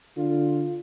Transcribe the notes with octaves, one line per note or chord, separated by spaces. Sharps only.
D3 F4